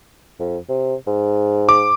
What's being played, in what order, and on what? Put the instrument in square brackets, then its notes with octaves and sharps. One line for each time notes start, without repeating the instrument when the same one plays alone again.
[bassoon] F2
C3
G#2
[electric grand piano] D6